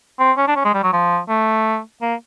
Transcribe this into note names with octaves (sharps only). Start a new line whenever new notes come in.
C4
C#4
D4
C#4
G#3
G3
F#3
F3
A3
A#3